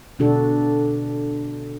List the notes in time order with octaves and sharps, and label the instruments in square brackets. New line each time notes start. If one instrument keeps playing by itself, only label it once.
[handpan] B2 D3 D4 F#4 A4